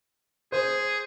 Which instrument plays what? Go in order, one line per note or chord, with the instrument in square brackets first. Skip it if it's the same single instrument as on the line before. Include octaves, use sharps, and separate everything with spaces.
[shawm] G#4 [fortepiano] C5